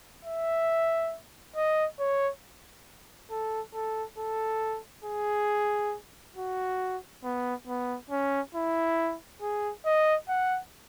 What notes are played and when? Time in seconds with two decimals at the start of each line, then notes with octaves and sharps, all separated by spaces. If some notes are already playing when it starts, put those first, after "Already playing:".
0.25 E5
1.56 D#5
1.99 C#5
3.30 A4
3.74 A4
4.18 A4
5.04 G#4
6.36 F#4
7.24 B3
7.67 B3
8.10 C#4
8.55 E4
9.42 G#4
9.85 D#5
10.29 F#5